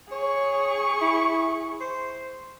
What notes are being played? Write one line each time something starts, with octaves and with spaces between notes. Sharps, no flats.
G#4 C#5 C#6
E4
C5